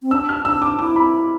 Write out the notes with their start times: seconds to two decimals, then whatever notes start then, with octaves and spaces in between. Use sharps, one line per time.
0.02 C4
0.11 D4 E6
0.29 F6
0.45 D4 E6
0.62 D6
0.79 E4 D6
0.96 B5